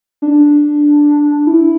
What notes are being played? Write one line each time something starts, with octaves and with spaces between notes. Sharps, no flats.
D4
E4